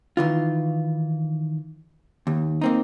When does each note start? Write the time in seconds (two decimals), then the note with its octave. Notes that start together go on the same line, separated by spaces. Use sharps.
0.17 D#3 E3 F4
2.27 D#2
2.61 A#3 C4 D#4